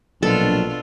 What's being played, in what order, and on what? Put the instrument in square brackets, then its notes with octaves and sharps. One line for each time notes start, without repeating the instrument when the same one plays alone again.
[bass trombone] A#1 [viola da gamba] B2 D4 F4 [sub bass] F#3 [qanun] A4